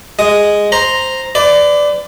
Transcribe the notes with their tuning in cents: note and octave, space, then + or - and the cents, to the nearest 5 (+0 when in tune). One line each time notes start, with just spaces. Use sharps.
G#3 -5 D#6 +0
C5 +0 A#5 +0
B4 +40 D5 +0